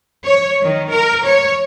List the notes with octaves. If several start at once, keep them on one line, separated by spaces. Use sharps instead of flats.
C#5
D#3
A#4
C#5